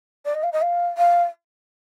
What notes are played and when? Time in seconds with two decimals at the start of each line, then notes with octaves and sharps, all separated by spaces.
0.25 D5
0.34 D#5
0.43 F5
0.52 D#5
0.62 F5
0.98 F5